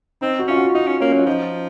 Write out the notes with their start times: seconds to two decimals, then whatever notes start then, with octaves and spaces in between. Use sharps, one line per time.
0.21 C4 D#4
0.39 F#4
0.48 C#4 F4
0.57 F#4
0.75 D#4 F4
0.87 C#4
1.00 A#3 C#4
1.13 F#3
1.19 F4
1.26 F3 D#4